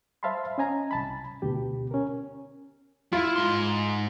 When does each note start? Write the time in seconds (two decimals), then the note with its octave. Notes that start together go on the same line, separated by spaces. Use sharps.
0.23 C5 E5 F5 A5 B5 C6
0.58 C#4 D#5 G#5 A#5
0.91 C2 A5 B5
1.42 D2 B2 G4
1.91 C#4 A#4
3.13 E4 F4
3.36 G#2 C6